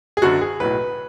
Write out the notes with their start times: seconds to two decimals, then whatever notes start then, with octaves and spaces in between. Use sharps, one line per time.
0.17 G#4
0.22 F#1 F#2 D3 F#4
0.41 G#4
0.60 B1 A2 F#3 B4